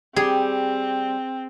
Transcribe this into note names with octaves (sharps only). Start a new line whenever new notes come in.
G3 C4 G4 G#4